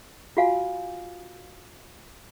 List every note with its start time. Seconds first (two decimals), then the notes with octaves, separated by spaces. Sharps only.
0.37 F4 F#4 F5 G#5